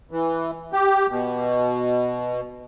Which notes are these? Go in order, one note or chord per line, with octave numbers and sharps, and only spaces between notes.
E3
G4
B2